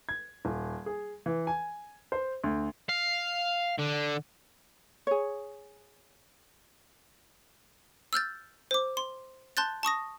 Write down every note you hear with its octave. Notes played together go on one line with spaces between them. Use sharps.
G#6
D#1
G#4
E3
G#5
C5
D2
F5
D3
G#4 C#5
E6 F6 G6 A6
C5 D6
C6
A5 C6 F#6 G6 A6
A5 C#6 D#6 A#6